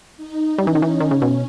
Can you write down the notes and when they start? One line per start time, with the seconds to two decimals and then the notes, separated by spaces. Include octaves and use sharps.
0.17 D#4
0.58 G3 C#4
0.67 E3
0.75 D#3
0.82 E3
1.00 D#3 C#4
1.11 C#3
1.22 B2